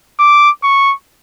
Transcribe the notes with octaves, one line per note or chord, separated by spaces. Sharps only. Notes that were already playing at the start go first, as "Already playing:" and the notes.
D6
C#6